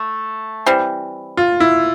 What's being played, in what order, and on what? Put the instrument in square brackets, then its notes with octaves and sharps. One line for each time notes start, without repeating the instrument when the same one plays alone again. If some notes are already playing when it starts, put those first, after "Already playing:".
Already playing: [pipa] A3
E3 G3 C4
[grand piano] F4
E4